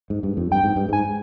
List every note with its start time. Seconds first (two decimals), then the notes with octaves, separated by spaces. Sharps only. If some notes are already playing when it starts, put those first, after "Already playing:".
0.10 G#2
0.23 G2
0.37 F2
0.51 G2 G5
0.64 G#2
0.76 G2
0.89 G#2 G#5